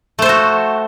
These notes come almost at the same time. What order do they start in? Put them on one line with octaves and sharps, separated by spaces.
A3 C5 A4 F#4